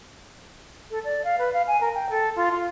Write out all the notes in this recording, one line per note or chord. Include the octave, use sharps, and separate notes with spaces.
A4
D5
F5
B4
F5
G#5
A#4
G5
A4
F4
F4